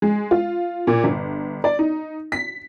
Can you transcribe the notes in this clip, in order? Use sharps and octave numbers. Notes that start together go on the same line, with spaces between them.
G#3
F4
A#2
G1
D5
D#4
B6